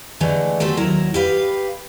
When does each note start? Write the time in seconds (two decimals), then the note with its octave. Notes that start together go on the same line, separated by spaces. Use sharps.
0.20 D3 E3 G#3 A3
0.60 F#3 A3 G4 A4 C5
0.77 D#2 F#3 E4 A#4
1.14 G4 B4 F5